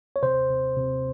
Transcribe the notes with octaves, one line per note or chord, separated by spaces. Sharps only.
C#5
C3 C5
C3
C3